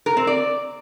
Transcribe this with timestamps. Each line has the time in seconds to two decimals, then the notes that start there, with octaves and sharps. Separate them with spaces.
0.06 A#4
0.17 C4
0.27 D5